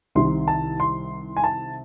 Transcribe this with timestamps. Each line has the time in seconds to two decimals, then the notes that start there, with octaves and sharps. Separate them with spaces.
0.15 C2 C3 D#3 C6
0.48 A5
0.80 C6
1.37 G#5
1.44 A5